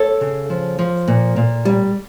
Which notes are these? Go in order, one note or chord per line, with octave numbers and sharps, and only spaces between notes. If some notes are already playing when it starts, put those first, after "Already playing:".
Already playing: A4 C#5
C#3
F3
F3
A#2
A#2
G3